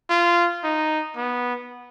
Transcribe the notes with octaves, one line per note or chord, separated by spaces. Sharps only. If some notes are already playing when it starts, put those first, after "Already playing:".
F4
D#4
B3